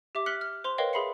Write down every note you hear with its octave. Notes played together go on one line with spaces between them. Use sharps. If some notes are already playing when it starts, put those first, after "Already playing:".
G4 E5 D6
F6 F#6 B6 C#7 F#7 G7
F6
C5 C6 F7
A#4 B4 C#5 D#5 F5 G5
G#4 E5 B5 C6 C7 C#7